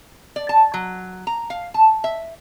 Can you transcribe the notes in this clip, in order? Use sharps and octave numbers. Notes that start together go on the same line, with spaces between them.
D5
A5
F#3
A#5
F5
A5
E5